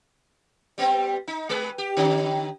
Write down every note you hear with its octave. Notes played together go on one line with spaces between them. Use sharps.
G3 B3 C4
D#4
G#3 G#4 B4
G4
D3 C#4 D#4